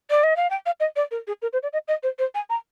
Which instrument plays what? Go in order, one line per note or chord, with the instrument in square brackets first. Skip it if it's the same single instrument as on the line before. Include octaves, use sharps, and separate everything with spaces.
[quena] D5
D#5
F5
G5
F5
D#5
D5
A#4
G#4
A#4
C5
D5
D#5
D#5
C5
C5
G#5
A#5